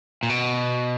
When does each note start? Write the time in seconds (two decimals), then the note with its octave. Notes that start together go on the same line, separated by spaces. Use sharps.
0.23 A#2
0.29 B2